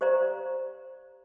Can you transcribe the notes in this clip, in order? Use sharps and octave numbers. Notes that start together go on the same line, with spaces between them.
G4 C5 D5 F5 A#5